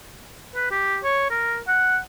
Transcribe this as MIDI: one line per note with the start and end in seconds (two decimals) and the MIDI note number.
0.55 0.66 71
0.71 0.98 67
1.04 1.28 73
1.30 1.58 70
1.68 1.98 78